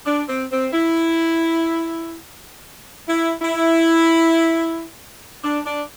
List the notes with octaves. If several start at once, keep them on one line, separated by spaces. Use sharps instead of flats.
D4
C4
C4
E4
E4
E4
D4
D4